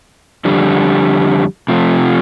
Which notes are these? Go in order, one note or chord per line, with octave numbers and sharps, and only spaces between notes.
F2 D3 G3
C3 F3 A3